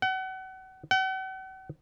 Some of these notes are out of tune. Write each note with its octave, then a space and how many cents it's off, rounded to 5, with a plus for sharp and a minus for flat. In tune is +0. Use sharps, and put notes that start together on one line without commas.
F#5 +35
F#5 +45